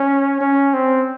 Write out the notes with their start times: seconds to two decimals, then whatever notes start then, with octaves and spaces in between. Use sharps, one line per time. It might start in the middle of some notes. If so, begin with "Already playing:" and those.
Already playing: C#4
0.41 C#4
0.74 C4